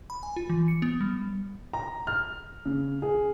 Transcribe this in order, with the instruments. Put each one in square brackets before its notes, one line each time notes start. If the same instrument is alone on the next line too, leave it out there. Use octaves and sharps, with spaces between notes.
[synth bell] B5
G#5
F4
E3
C#7
B3
G3
[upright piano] A#5
F6
C#3
G#4